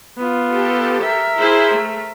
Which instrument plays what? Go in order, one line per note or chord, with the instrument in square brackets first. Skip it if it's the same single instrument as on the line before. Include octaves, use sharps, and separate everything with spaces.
[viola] B3 F4
[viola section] G4 A4
[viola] A#4 E5
[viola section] E4 G#4 C5
A3